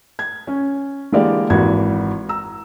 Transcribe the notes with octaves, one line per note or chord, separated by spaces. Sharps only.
G#6
C#4
D3 E3 G#3 A#3 G4 D5
G#1 E3 F#4 G#6
A#5 E6